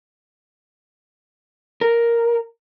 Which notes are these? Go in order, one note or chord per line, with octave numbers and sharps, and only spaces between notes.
A#4